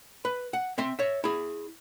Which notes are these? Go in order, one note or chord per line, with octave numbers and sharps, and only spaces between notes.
B4
F#5
C4 E5 C6
C#5 E5
E4 G#4